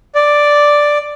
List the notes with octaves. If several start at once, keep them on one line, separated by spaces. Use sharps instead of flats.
D5